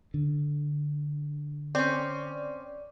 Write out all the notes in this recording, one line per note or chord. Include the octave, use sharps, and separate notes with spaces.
D3
C4 C#4 D5